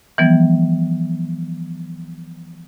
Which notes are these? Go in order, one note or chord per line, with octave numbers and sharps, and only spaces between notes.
E3 F3 G3 B3